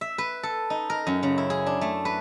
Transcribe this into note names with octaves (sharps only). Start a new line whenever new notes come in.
E5
B4
A4
D#4
A#4
F#2
C#3
E4
G#4
D4
A3
B4